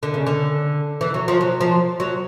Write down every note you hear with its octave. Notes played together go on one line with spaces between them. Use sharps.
D3
C#3
D3
E3
F#3
F3
F#3
F3
F#3